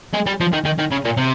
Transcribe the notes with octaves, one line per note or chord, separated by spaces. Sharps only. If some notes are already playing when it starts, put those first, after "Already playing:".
G#3
G3
F3
D#3
D#3
D#3
C#3
A#2
C3